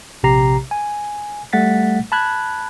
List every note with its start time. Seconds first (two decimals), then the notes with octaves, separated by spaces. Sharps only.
0.23 A#1 C3 G4 A#5 C7
0.71 G#5
1.53 G3 A3 F#5 A6 B6
2.12 A5 B5 F#6 G#6